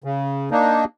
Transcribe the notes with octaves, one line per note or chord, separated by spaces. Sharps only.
C#3
A#3 D4 D#4